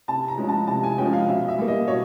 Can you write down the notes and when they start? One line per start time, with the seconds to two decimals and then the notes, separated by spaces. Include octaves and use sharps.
0.08 C3 A5
0.28 A#5
0.38 F3 G#3 C#4
0.49 A5
0.67 C3 A5
0.83 G#5
0.98 F3 G#3 C#4 G5
1.13 F5
1.28 B2 E5
1.48 E5
1.59 G3 A#3
1.68 D#5
1.87 B2 C#5